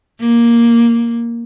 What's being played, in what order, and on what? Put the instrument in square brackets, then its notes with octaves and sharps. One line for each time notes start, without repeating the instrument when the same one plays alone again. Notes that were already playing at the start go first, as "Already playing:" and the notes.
[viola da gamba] A#3